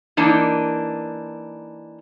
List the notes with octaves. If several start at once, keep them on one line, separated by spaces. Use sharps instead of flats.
E3 A#3 D4 D#4